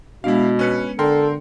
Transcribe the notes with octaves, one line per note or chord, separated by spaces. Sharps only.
B2 G#3 B3 D4 E4 F5
C#4 B4 C#7
D3 A4 A#4 G5 C6